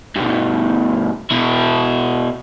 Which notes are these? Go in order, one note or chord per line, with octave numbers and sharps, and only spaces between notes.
G2 B2
B2 E4